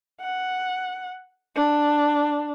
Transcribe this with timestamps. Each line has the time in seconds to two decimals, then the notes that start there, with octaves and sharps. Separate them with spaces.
0.21 F#5
1.55 D4